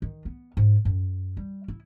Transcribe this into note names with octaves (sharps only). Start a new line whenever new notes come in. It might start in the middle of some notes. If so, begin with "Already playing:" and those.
D#3
B3
G#2
F#2
G3
E4